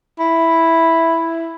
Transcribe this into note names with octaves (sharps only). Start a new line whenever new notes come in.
E4